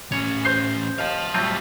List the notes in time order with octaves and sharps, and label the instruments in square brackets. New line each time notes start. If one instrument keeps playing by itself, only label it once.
[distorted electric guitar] A2 C#4 [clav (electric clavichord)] C#5
[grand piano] C5 G6 C7
[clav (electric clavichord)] D#2 [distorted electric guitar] F5 A5
[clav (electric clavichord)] A2 C4 F4 [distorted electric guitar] F#3 G3